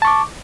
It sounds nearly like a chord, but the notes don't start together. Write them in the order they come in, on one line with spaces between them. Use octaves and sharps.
A5 C#6 D6